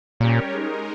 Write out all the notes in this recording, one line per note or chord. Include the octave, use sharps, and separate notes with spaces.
A#2 G3 C#4 G4 A#4 C#5
G#3 D#4 A#4